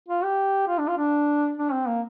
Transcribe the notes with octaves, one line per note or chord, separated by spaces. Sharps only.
F4
G4
F4
D4
F4
D4
D4
C4
A#3